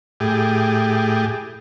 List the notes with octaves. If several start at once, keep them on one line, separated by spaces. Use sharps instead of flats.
A2 G4 G#4